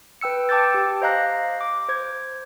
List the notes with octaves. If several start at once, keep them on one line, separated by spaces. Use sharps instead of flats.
B4 G5 E6 C#7
G5 A5 D6 E6 G6 A6
G4 G5
C5 D#5 F5 A#5 F#6 A#6
D6
C5 G#6